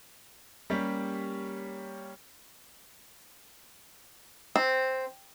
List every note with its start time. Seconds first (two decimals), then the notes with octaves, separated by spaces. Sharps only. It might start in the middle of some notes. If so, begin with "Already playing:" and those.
0.70 G3 A#3 C#4 G4
4.56 C4